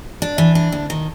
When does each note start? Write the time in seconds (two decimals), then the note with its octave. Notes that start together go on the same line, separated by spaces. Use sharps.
0.22 D4
0.38 E3
0.55 D4
0.72 D2
0.90 D#3